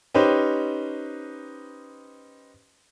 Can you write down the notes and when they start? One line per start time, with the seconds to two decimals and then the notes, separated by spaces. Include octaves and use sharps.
0.15 C#4 D#4 G4 B4 C5